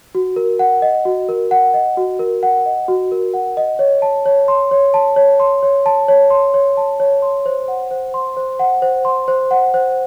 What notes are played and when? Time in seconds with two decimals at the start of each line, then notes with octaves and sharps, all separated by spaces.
0.15 F#4
0.36 A#4
0.59 F#5
0.82 D#5
1.05 F#4
1.29 A#4
1.51 F#5
1.74 D#5
1.97 F#4
2.19 A#4
2.43 F#5
2.66 D#5
2.88 F#4
3.12 A#4
3.34 F#5
3.57 D#5
3.79 C#5
4.02 A5
4.26 C#5
4.48 C6
4.71 C#5
4.94 A5
5.16 C#5
5.40 C6
5.63 C#5
5.86 A5
6.08 C#5
6.30 C6
6.54 C#5
6.77 A5
7.00 C#5
7.22 C6
7.46 C5
7.68 F#5
7.91 C5
8.14 C6
8.37 C5
8.59 F#5
8.82 C5
9.05 C6
9.28 C5
9.51 F#5
9.74 C5